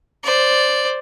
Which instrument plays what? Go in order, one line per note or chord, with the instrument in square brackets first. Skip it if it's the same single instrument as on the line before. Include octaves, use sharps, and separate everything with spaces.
[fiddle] C5 D5